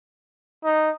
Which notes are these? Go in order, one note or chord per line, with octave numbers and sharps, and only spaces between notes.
D#4